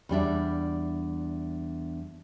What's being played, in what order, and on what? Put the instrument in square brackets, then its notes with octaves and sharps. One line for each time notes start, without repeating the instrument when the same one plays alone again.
[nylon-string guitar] E2 G3 D4 E5